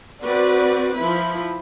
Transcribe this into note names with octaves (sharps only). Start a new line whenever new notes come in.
C4 F#4 B4 D5
F3 E4 B5